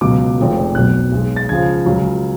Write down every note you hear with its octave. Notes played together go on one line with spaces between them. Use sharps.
C#2 B2 F#3 D6
F1 F2 F3 G#3
B1 B2 F#3 F#6
B1 B2 G#3
A6
C#2 C#3 F3 G#6
C#2 C#3 F#3